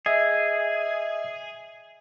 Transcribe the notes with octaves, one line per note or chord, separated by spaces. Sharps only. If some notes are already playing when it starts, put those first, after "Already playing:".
G#4 D#5 E5